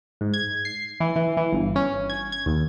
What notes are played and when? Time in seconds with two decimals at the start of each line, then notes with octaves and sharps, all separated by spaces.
0.21 G#2
0.34 G#6
0.65 C7
1.00 E3
1.16 E3
1.37 E3
1.53 G1
1.76 C#4
2.10 G#6
2.32 G#6
2.46 D#2